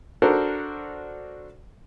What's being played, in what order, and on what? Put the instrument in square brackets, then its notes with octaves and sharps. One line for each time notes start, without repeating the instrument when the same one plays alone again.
[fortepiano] D4 F#4 A4 A#4 C5